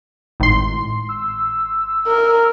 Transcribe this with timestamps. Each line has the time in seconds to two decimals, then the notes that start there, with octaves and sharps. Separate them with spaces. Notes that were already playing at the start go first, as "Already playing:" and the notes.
0.40 G#1 A2 C6
1.09 E6
2.07 A#4